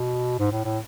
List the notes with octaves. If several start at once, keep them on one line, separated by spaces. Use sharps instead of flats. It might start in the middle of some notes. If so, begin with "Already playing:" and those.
Already playing: B2
G#2
A2
A2